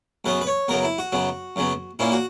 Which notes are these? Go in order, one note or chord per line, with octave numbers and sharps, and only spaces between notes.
F#2 C#3 F#3 B3 B4
B4
C#5
F#2 C#3 F#3 B3 A#4
E4
F#4
F#2 C#3 F#3 B3
F#2 C#3 F#3 B3
A#2 A#3 C#4 E4
F#4